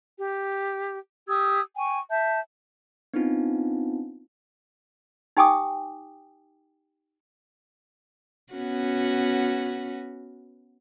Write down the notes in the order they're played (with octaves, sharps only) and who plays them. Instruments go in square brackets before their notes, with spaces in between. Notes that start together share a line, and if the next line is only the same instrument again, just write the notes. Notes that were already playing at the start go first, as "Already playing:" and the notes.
[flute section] G4
G4 D#6 E6 G#6
G5 G#5 C#6
E5 A5 G6
[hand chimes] B3 C4 D4 D#4 F4
[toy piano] D#4 G4 G5 G#5 D6 D#6
[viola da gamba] B3 C#4 F#4